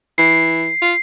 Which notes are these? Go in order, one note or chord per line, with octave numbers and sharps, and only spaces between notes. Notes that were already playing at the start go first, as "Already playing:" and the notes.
E3 C7
F4